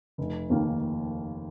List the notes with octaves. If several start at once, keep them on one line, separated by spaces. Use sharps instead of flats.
F1
D#2 D#3 A#3